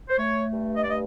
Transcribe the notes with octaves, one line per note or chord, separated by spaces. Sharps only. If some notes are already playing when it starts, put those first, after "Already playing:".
C5
A3 C#5
G2
D#5
D5
A3 D#5